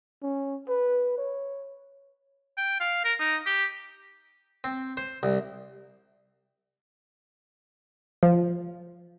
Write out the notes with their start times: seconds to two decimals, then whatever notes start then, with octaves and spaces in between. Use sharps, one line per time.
0.22 C#4
0.69 B4
1.18 C#5
2.58 G5
2.80 F5
3.04 A#4
3.20 D#4
3.46 G4
4.64 C4
4.97 C5
5.23 C2
8.23 F3